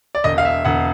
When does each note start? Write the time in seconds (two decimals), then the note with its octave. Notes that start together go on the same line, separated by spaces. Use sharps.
0.15 D5
0.24 E1 D#5
0.38 F5
0.45 E5
0.65 E1 F#5